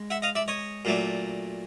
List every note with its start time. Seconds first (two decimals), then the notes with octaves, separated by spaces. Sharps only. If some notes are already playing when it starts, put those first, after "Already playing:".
Already playing: G#3
0.10 E5 F#5
0.22 D#5 F5
0.35 D5 E5
0.48 C#5 D#5
0.85 A#2 F#3 A3 D4